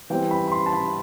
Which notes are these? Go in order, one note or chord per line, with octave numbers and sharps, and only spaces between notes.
E3 G3 C4 G5
B5
B5
C6
A5
B5